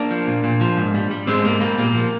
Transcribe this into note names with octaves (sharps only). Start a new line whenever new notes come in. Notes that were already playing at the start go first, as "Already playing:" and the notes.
Already playing: A#3 D4
F3
A#2
A#2
F3
G#2
G3
G3
G#2 G#3 C4
G#2 A#3
G3 A#3
A#2 A#3
F3